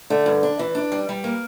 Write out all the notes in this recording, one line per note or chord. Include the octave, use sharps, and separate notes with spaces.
D3 A3
G2
D4
E3
D4
G3
G3
A#3